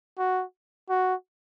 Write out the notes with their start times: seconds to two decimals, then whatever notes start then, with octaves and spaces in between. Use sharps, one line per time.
0.18 F#4
0.90 F#4